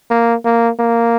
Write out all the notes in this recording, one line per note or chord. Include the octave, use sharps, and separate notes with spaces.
A#3
A#3
A#3